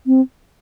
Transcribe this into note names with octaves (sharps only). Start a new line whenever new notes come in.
C4